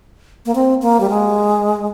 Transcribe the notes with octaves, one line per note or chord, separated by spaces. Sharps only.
A#3
C4
A#3
G3
G#3